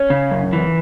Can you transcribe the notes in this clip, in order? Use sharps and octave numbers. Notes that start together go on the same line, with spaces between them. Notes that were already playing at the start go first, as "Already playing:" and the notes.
Already playing: C#4
C#3
F#2
E3